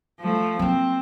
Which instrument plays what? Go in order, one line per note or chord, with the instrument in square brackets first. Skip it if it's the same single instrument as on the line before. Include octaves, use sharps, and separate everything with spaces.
[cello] F3 A3
[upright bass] F#3 A#3 [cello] C4